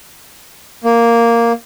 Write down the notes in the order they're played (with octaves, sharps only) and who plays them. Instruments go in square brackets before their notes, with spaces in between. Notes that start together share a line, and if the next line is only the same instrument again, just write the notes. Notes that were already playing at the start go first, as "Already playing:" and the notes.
[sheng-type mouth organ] A#3